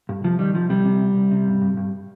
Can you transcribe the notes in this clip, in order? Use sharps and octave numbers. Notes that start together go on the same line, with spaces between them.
G2
C2 F3
D#3 G3
C2 F3
C3 G3
C3
C2
C2
C3
G2
G2
G2